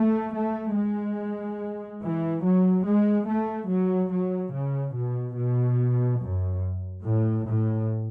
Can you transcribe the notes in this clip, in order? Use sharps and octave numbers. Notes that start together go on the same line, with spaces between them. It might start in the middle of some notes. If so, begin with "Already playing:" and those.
Already playing: A3
A3
G#3
E3
F#3
G#3
A3
F#3
F#3
C#3
B2
B2
F#2
A2
A2